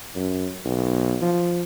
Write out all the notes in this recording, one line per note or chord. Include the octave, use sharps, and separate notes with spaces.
F#2
B1
F3